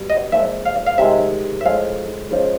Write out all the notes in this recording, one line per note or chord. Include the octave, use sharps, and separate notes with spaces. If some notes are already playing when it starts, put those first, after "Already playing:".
Already playing: B2 G3
D#5
A#2 F3 G#3 E5
F5
F5
C3 D#3 G#3 E5
E5
A2 F3 G#3 F5
C#3 F3 G#3